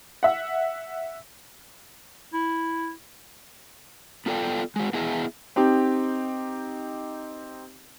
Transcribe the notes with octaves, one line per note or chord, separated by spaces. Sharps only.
E5 F#5
E4
B3 F4 A4 D5 G5
G#3 F#4
B3 E4 G#4 D#5 E5
C4 D#4 G4